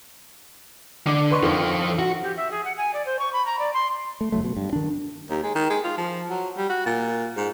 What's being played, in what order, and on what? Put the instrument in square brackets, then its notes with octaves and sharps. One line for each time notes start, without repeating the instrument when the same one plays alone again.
[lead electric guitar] D3 [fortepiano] D6
[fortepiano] B4 C6 C#6
[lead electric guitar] F2 F3 [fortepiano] D3 D#3
[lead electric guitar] F#4
[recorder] G4
E5
G#4
F#5
G#5
D5
C5
C#6
B5
A#5
D5
C6
[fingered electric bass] A3
F#1 G2 F#3 A3
B2
G2
D#3 D4
[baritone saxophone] D#2
G#3
D#3
G#3
F4
F3
F#3
G3
F#4
A#2
G#2